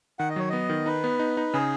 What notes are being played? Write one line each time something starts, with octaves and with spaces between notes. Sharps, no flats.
D#3 F#5
D#5
F#3 C#5
B3 D#5
D#3
D#4 B4
B3
D#4
D#4
C#3 G#4